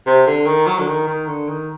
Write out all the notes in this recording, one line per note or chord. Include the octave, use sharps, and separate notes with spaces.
C3
D3
D#3
F#3
D3
D#3
D#3
D3
D#3